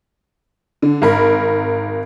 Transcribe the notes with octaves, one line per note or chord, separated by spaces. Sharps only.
D3
G#1 A#4 B5